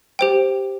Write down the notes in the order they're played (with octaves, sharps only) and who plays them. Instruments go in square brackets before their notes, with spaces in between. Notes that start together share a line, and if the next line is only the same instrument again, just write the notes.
[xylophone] G4 C5 G5